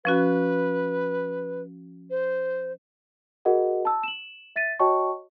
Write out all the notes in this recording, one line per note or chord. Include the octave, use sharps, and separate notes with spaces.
F3 C#4 F#4 B4
C5
F#4 G#4 A#4 D#5 F#5
A5 E6
E7 F#7
E5 A6 B6 D#7
F#4 C#5 D#5 G5 A5 C#6